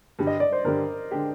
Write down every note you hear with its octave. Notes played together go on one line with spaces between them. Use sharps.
G2 D3 G3 D4
D#5
D5
C5
G2 D3 G3 D4 A#4
D3 G#3 D4 G4